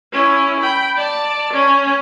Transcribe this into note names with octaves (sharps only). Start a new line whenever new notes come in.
C#4 E4
G5 B5
D5 A5
C#4